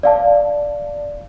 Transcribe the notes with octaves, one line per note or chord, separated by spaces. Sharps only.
D5 F5 A5